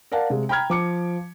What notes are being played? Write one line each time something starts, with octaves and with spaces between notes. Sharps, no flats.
A#4 D5 F5 F#5 A5
C3 G#3
G5 A#5 B5 F6 G#6
F3 D6 C#7